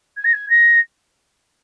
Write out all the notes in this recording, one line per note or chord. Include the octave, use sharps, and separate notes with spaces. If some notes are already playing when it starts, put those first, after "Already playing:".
G#6
A#6
G#6
A#6